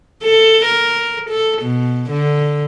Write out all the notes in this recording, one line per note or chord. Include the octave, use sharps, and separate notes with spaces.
A4
A#4
A4
B2
D3